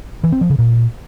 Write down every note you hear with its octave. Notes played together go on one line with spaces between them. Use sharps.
E3
C4
F3
C#3
A#2